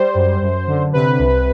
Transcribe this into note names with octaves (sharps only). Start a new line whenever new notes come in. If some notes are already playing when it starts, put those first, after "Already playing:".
Already playing: G3 C5
F#2
F#2
D3
C3 B4
C2